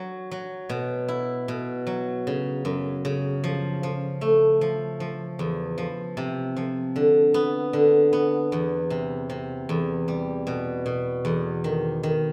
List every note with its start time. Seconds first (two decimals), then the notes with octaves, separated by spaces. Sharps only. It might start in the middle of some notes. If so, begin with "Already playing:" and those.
Already playing: F#3
0.31 F#3
0.69 B2
1.08 E4
1.48 B2
1.87 F#3
2.27 C#3
2.65 F#2
3.05 C#3
3.44 F3
3.83 F3
4.21 A3
4.61 F3
5.00 F3
5.39 E2
5.78 F3
6.17 C3
6.56 F3
6.96 D3
7.34 B3
7.73 D3
8.13 B3
8.52 E2
8.90 C3
9.30 C3
9.69 E2
10.08 G3
10.47 B2
10.86 B2
11.25 E2
11.64 D#3
12.03 D#3